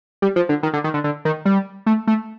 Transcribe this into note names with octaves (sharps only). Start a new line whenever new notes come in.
G3
F3
D3
D#3
D3
D#3
D3
D3
D#3
G3
A3
A3